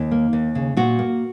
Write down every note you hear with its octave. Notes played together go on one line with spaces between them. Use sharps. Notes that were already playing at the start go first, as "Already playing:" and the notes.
Already playing: D#2 D#4
A#3
D#2
C#3
A#2 F#4
A#3